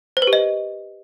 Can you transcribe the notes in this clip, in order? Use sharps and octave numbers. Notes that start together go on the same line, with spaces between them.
C5
B4
G4
D#5